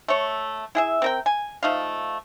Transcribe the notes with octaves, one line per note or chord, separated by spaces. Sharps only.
A3 C#5
E4 G#4 E5
C4 A#4 G5
G#5
F3 A3 D#4 F5